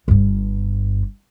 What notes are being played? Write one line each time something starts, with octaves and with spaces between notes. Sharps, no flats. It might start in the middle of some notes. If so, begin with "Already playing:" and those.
G1 G2